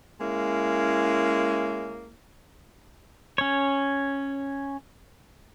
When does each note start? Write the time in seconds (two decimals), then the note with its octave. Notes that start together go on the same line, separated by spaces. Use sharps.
0.20 G#3 A#3 C#4 E4
3.38 C#4 C#5